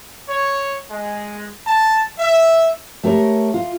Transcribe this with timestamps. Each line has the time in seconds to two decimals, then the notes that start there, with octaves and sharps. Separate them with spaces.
0.28 C#5
0.90 G#3
1.65 A5
2.19 E5
3.03 A3 G4 A#4 C#5
3.54 F4